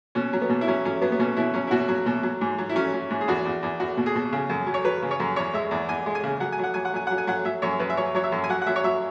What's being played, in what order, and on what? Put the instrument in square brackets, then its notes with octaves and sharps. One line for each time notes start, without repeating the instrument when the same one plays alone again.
[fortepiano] B2 C#4
F#3
B3
B2
E4
F#3 C#4
F#3 C#4
F#3 B3
B3
B2 C#4
B2 E4
F#3 C#4
E4
B2 F#4
F#3
B2
F#3
G#2
F#3
E4
F#3 C#4
F#3
G#2
G#4
E2 F#4
E2
E2
E2 F#4
B2
G#4
B2
C#3
F#2
F#3
C#5
F#3 B4
C#3
C#5
F#2
E2 C#5
G#3 E5
E2
E2 G#5
G#3
G#5
C#3
F#3 F#5
G#5
F#3 F#5
F#3 G#5
F#5
F#3 G#5
F#3 F#5
G#5
F#3 F#5
F#3 E5
F#2 C#5
F#2 B4
E5
F#3 C#5
F#3 C#5
E5
F#2
G#5
F#3 F#5
F#5
F#3 E5
C#5
F#3 E5